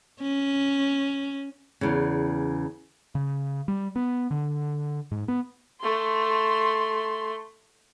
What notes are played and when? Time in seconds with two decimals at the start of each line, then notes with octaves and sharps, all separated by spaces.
0.21 C#4
1.81 E2 C#3
3.15 C#3
3.68 G3
3.96 B3
4.31 D3
5.11 G#2
5.28 B3
5.80 A3 C6